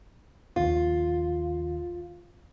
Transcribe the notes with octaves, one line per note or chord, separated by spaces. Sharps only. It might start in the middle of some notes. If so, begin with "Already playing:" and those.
A#1 D#2 D#3 F4